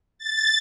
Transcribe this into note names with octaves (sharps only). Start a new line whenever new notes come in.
A6